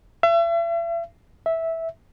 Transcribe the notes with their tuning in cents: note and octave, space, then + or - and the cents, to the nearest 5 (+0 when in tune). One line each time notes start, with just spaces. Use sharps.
E5 +40
E5 -10